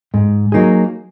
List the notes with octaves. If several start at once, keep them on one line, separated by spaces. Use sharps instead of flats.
G#2
F#3 A#3 D#4 G#4